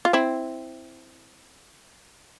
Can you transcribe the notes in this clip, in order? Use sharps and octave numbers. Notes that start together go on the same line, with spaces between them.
F4
C4 E4